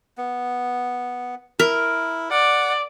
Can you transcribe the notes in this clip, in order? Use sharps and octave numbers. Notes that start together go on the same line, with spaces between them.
B3
E4 A#4
D5 F#5